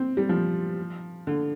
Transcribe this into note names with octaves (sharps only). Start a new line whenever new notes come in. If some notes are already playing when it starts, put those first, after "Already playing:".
Already playing: C4
G3
F3
D3